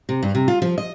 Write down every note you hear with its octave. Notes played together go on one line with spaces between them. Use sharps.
C3
G2
C3
F4
F3
D#5